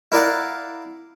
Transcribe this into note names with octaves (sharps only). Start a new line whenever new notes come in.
E4 A#4 D5 F5 F#5